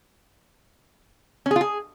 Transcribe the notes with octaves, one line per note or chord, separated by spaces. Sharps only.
C#4
G#4
F4
G#4